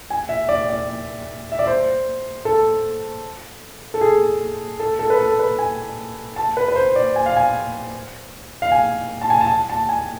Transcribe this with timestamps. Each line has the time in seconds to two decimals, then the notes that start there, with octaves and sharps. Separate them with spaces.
0.10 G#5
0.29 E5
0.49 D5
0.69 D5
1.52 E5
1.59 D5
1.67 C5
2.45 A4
3.94 A4
4.01 G#4
4.80 A4
4.99 A4
5.10 B4
5.19 A4
5.39 B4
5.59 G#5
6.36 A5
6.57 B4
6.68 B4
6.76 C5
6.96 D5
7.16 G#5
7.26 F5
7.37 G#5
8.62 F5
8.72 G#5
9.21 A5
9.30 G#5
9.41 A5
9.70 A5
9.89 G#5